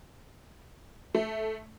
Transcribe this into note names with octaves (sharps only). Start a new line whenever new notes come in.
A3